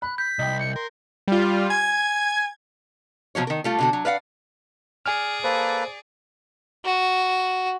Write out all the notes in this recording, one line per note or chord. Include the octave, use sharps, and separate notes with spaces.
B5 F#6
G6 B6
C2 D#5 G5
C#7
A#4 C6
G3 F4
G#5 G#6
B2 F3 F#3 C#5
D#3 A#4
G3 A3 F4
B2 D3 F#4
F#3
B4 D5 F5 F#5
G#4 D5 G#5 F6
A#3 A4 B4 C5
F#4